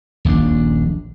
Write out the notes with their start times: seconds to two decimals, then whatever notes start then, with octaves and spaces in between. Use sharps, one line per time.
0.25 D#1 A#1 B2 D4